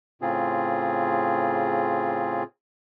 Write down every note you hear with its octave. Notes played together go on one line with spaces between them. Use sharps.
A2 C#3 C4 F4 G#4